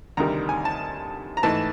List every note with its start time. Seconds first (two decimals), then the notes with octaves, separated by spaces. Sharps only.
0.17 D2 C3 D#3 G3 A#5
0.49 G#5
0.65 A5
1.37 A#5
1.43 G#2 E3 A3 A5